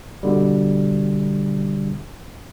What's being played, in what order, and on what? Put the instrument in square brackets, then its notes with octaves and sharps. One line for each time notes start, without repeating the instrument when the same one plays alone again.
[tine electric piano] B2 D3 G3